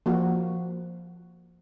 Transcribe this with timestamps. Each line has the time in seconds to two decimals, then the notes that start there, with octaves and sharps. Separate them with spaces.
0.06 F3 A#3 F#4